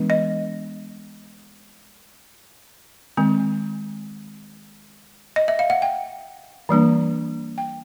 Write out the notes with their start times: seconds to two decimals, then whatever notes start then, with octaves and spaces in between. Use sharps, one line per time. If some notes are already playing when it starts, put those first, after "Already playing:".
Already playing: E3 G#3 B3 D4
0.10 D#5
3.17 D#3 G#3 C4
5.36 D#5
5.48 E5
5.59 F5
5.70 F#5
5.82 G5
6.69 E3 G3 A#3 D4
7.58 G5